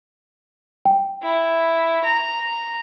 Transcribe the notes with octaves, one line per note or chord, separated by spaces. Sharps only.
G5
E4
A#5